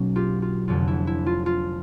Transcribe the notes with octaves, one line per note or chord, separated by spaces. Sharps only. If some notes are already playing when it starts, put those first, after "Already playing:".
Already playing: B1 B2 F#3 A#3 C#4
F4 G4
F4
F1 F2 D3 F4
E4
E4
F4
F4